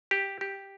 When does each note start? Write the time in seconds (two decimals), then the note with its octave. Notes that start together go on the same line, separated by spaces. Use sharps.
0.11 G4
0.41 G4